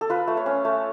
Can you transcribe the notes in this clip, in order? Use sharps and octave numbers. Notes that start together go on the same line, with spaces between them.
A4
F4 B4
A3
C#5
C#4
A3